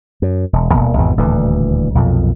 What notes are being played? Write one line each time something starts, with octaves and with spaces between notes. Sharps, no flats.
F#2
E1
D#1 D#2 B2 A#3
G#1 E2 G#2 B2
D#1 D2 A2 E3
B1 F2 A#2